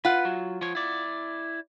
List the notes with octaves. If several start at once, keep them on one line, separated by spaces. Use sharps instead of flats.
F4 B4 F#5
F#3
F3 C#5
E4 D5